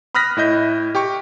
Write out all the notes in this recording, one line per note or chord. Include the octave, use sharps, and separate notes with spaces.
B5 D#6 F6 F#6 A#6 B6
A2 E4 D#5 G6
G4 G5 C#6